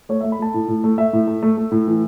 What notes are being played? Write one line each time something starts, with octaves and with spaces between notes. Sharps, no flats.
A3 C#5
A3 E5
B5
A3 A5
A2
A2
A3
A3 E5
A2
A3
A3
A3
A2
E3